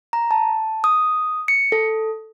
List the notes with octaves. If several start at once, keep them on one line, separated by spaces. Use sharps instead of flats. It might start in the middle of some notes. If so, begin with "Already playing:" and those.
A#5
A5
D#6
C#7
A4